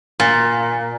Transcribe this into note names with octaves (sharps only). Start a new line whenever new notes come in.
A#2